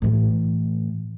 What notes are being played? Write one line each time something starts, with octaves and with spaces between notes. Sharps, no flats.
A2 E3